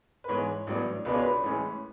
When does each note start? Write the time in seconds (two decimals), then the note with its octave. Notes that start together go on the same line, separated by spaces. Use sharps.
0.24 B4
0.28 G#2 E3 G#3 B3 C#5
0.67 A1 A2 F#3 B3 D4
1.05 C#2 B2 G#3 B3 D4 B4
1.14 C#5
1.22 B4
1.43 A1 A2 G#3 C#4